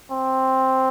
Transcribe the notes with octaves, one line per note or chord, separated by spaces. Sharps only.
C4